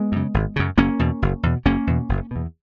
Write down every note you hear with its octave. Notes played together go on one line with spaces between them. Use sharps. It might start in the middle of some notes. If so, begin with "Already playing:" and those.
Already playing: G#3 B3
F#2 C#3
G#1
F#2 C#3
F#1 A#3 C#4
E2 B2
F#1
E2 B2
F#1 A#3 C#4
E2 B2
F#1
E2 B2